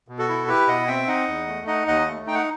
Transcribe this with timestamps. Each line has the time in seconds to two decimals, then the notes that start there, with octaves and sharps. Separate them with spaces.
0.08 B2
0.18 F#4 A4
0.29 E4
0.47 E4 G4 B4
0.68 B2 D#5 F#5
0.87 C4 E5 G5
1.08 D#4 D#5 F#5
1.28 E2
1.47 A3
1.67 D#4 D#5 F#5
1.87 D#2 D#5 F#5
2.08 A3
2.27 D#4 G5
2.35 F#5